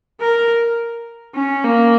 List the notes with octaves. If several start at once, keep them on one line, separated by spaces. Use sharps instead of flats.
A#4
C#4
A#3